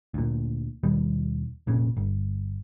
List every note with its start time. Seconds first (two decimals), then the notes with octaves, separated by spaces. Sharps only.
0.14 D2 A#2
0.84 D#2 B2 D#3 G3
1.67 F1 A#2 C#3
1.97 G1